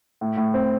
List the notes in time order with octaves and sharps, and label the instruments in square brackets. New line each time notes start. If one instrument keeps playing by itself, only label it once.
[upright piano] A2
A2
C4